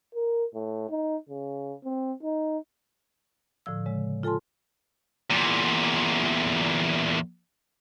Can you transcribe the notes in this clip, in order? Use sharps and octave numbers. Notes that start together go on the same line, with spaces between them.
A#4
A2
D#4
C#3
C4
D#4
A2 D3 F3 E6
C#3 G#3
F4 A4 G#5 A5 C6
E2 A#2